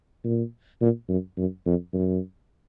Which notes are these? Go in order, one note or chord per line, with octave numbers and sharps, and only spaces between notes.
A#2
A#2
F#2
F#2
F2
F#2